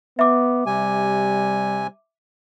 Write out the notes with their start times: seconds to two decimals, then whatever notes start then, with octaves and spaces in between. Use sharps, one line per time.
0.19 B3 E5 D6
0.66 C3 G3 G#5